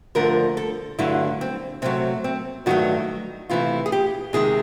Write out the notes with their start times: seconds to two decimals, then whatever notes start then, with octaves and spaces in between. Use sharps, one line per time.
0.15 G2 D3 F3 A3 A#4
0.57 A4
0.99 G2 D3 F#3 A3 E4
1.41 C4
1.82 C3 D#3 F#3 A3 C4
2.24 C4
2.66 G2 D#3 F#3 A3 F#4
3.50 C3 E3 A3 F4
3.86 G#4
3.92 G4
4.33 C3 D#3 G#3 G#4